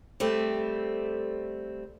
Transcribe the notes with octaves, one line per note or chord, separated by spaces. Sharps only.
G3 A3 C4